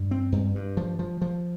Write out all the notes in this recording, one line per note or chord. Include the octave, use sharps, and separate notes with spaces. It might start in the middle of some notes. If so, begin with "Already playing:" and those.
Already playing: G2
C4
G2
G2
F3
F3
F3